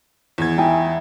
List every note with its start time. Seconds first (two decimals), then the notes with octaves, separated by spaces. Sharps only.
0.38 E2 G#6
0.58 D#4 E4 G5 G#5